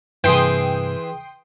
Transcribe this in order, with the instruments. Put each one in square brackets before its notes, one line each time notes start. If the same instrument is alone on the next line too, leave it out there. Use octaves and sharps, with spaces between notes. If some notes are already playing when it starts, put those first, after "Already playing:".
[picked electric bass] G2 C3 [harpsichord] E3 G#4 [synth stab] G5 C6 D#6